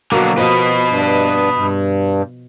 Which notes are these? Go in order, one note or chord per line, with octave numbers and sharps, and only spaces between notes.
B2 D3 F#3 A#3
B2 F3 B4 D#5
G2
G2